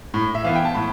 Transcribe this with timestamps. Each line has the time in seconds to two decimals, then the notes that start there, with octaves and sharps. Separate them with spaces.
0.14 A2
0.35 E5
0.44 E3 B3 F5
0.56 G5
0.65 A5
0.74 A2 B5